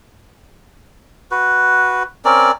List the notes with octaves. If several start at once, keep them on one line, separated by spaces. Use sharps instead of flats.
F#4 B4
C4 C#4 A#4 D5